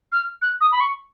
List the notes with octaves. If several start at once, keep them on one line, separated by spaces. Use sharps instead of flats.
F6
F#6
D#6
B5
C#6